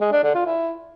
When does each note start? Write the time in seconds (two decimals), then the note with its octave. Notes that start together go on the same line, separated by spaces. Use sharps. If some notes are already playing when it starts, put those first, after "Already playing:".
0.01 G#3
0.12 D4
0.23 D3
0.35 F4
0.46 E4